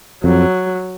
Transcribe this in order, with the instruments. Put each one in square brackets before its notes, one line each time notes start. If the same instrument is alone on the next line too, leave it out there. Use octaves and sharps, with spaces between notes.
[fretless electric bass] F2 [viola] F#3